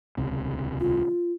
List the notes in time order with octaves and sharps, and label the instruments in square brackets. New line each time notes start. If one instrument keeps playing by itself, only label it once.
[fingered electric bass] D#1 C#2 C3
[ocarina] F4